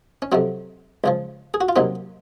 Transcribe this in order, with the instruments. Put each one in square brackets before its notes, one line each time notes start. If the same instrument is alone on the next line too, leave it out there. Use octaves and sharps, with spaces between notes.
[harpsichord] C#4
F2 C3 F#3 C4
C#2 C#3 F3
G#4
F#4
F4
C2 A#2 F#3 C4 D#4